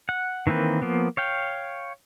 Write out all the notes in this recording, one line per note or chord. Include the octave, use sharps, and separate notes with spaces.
F#5
D#3 E3 A#3 C4 B4
F3 A#3 B3
C#5 F5 G5